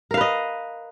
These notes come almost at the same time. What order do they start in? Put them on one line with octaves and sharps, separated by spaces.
A#4 F5 B4 D#5